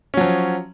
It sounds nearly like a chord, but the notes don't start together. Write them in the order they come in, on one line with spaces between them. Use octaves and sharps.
C#4 F#3 F3